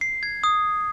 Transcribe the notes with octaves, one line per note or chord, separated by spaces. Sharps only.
C7
G#6
D#6